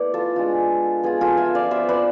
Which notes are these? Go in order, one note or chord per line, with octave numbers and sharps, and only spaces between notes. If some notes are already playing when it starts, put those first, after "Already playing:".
Already playing: A3 B3 E4 B4 D5
F4 A4
G#3 D4 F4
B3 F4 G#4
F4 A4
E5 G#5
D5 F5
B3 F4 C5 E5
B4 D5